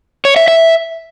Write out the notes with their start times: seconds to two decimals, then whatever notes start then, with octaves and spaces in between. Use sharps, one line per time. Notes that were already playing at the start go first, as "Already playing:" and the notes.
0.25 C#5
0.36 E5
0.48 E5